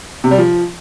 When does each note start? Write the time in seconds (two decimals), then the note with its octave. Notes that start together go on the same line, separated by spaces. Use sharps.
0.24 C3
0.31 G3
0.38 F3